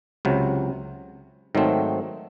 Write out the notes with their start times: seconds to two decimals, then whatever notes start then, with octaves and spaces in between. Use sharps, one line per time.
0.25 C#2 C3 F#3
1.55 G#2 D#3 F#3 A3 C4